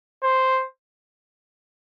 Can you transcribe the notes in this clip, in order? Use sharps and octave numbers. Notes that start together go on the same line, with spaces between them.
C5